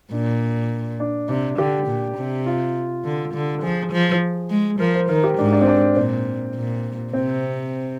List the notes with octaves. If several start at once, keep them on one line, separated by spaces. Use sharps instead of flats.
A#2 D4
D4
C3 D4
D3 G4
A#2
C3
F4
D3
D3
F3 G#4
F3
G#3
F3 A#4
C5
D#3 A#4
G4
G#2 D4
D4
C4
D4
A#2 C4
A#2
C3 C4